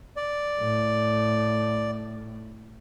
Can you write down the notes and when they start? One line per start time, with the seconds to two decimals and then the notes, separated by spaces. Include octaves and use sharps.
0.16 D5
0.59 A2